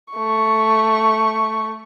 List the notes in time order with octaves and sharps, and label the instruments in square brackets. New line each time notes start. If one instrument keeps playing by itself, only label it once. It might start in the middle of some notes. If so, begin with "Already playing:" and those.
[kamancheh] A3 C#6